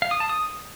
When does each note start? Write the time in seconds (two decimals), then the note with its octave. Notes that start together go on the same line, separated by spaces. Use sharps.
0.02 F5
0.11 D#6
0.20 A5
0.29 D#6